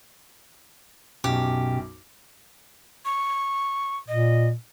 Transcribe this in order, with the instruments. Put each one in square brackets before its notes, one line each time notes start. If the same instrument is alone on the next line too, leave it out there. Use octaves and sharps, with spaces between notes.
[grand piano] B1 F#2 [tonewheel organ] B2 [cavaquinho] G4
[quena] C#6
[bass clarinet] A#2 [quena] D#5